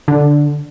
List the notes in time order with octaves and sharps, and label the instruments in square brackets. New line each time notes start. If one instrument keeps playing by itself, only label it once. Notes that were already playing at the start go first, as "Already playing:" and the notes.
[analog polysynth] D3